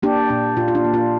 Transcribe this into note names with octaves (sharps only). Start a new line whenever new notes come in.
A#3 D4 G4
A#2 D4
A#2 F4
F4
D4
A#3
F4